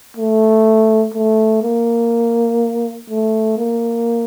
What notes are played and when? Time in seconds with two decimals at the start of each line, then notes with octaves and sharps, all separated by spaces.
0.17 A3
1.14 A3
1.63 A#3
3.10 A3
3.57 A#3